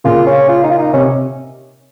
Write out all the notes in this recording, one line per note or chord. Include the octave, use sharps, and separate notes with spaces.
A#2 C#3 F4
C#4
F4
D#4
F4
D#4
C3 C#4